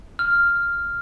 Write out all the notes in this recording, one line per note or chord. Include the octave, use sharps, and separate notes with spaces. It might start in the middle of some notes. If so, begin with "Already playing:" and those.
F6